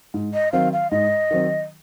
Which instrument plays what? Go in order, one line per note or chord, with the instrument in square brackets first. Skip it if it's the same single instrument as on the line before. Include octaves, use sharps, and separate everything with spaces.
[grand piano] G#2
[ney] D#5
[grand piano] D#3 F#3 C4 [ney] F5
[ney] F5
[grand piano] G#2 [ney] D#5
[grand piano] D#3 F#3 C4